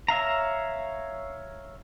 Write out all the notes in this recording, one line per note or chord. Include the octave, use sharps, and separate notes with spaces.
C#5 E5 F5 A#5